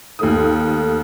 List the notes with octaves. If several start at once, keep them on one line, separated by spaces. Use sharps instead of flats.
D#2 A3 D#6